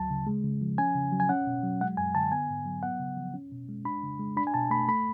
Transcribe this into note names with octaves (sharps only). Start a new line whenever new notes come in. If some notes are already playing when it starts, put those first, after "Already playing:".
Already playing: D2 F#3 A5
C#3
G#3
C#3
F3
C#4 G#5
C#3
F#3
G#5
C#4 F#5
B2
F#3
G#3 F#5
F#2 G#5
D3 A5
B3 G#5
G#2
F#3
B3 F#5
C#3
F3
C#4
B2
G#3
D4 B5
C#3
G#3
D4 B5
G#5
B2 A5
A3 B5
A3 B5